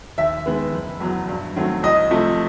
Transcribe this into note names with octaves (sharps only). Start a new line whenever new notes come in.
D#2 E5
D#3 G#3 B3
F#1
E2 B2 F#3
G2
D#3 F#3 A3 C4
C2 D#5
C3 F3 A3